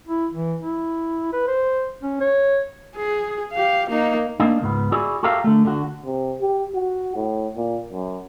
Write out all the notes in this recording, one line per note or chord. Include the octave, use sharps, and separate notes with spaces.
E4
E3
E4
B4
C5
C#4
C#5
G#4
G4 F5
A#3 D#4
A#3 D4 D#4
C#2 G#2 B3
E4 F#4 G#4 D5
F#4 G4 A4 A#4 E5 F5
D3 A3
D3 F#4
C3
G4
F#4
A2
A#2
F#2